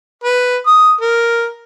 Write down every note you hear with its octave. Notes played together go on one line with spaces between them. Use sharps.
B4
D#6
A#4